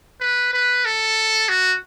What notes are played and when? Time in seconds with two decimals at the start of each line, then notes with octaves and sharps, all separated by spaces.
0.21 B4
0.53 B4
0.85 A4
1.49 F#4